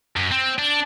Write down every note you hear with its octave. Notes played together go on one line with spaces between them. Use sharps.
F#2
C4
D4